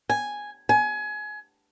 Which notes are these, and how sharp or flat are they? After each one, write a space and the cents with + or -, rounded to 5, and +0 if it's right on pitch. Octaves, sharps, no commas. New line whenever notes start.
G#5 +0
G#5 +25